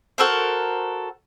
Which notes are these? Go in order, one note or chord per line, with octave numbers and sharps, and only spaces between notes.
F#4 A4 A#4 C5